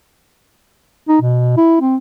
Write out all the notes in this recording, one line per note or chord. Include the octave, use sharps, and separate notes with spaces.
D#4
B2
E4
C4